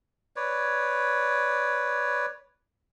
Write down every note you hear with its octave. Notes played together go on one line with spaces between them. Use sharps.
B4 C#5 D5